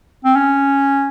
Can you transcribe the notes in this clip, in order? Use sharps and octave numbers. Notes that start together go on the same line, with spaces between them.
C4
C#4